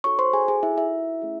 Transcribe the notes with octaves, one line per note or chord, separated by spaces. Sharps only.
D#4 F#4 A4 C#5 C#6
C5 C6
G#4 G#5
G#4 G#5
E4 E5
E4 E5
A3 C#4 G#4